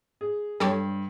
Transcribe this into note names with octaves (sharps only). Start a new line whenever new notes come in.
G#4
G2 G4 A4 C#5